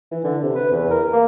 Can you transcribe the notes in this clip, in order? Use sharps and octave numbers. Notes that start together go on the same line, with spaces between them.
E3
D3
C3
B4
E2
A#4
A#3